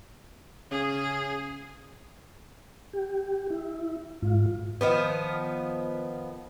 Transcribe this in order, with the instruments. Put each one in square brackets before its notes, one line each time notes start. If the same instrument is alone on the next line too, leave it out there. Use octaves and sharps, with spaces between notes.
[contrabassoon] C#3 [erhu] G#4
[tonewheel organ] G4
E4
G#2 F4
[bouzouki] D#3 F3 B3